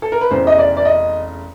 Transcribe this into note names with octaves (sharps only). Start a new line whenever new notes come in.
A4
A#4
B4
F1 E2 C#3 C5
D#5
D5
D5
D#5